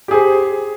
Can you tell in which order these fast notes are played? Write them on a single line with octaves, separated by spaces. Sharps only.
G4 G#4 C5